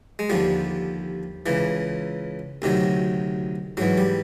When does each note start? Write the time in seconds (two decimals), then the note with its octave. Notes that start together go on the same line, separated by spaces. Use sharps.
0.19 G#3
0.30 D#2 D3 F3 G3
1.46 C#2 C#3 E3
2.62 D2 C3 D#3 F#3
3.77 G#2 E3 F#3
3.97 G3